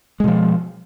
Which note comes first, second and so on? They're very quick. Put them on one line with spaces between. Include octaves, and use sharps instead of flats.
G#3 B2 F3